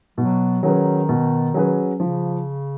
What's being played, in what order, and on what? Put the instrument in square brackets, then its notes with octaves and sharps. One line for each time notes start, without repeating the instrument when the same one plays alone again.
[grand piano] B2 [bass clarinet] F#3
[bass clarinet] D#3 [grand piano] F#3 C#4 G#4 B4
[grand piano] B2
F#3 C#4 G#4 B4
[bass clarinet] C#3 [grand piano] F3